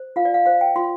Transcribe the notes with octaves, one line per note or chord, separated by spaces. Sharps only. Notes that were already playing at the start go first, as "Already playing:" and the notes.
Already playing: C5
F4 F5
D5
F5
C5 F5
G5
F4 C6